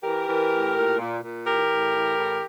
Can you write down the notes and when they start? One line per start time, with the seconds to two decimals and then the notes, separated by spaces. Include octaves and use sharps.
0.03 E3 G4 A#4
0.27 E3
0.50 A2
0.75 A#2
0.99 A#2
1.22 A#2
1.45 E3 G4 A#4
1.69 A2
1.93 E3
2.16 A2